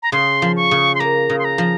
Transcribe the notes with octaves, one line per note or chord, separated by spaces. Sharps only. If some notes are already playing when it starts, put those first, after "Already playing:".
A#5
C#3 C6
F3
C#6
C#3
C6
A#3 A#5
C#3
C6
A#5
F3